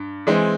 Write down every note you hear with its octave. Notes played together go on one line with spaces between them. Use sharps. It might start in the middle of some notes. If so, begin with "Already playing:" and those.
Already playing: G2
E3 G#3 C4